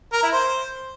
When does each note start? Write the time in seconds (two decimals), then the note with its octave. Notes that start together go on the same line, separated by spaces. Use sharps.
0.13 A#4
0.23 E4
0.32 C5